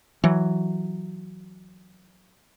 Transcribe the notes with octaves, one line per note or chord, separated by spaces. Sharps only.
E3 F#3